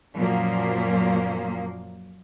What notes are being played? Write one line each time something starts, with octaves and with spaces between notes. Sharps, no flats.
F#2 A#2 F3 F#3 A#3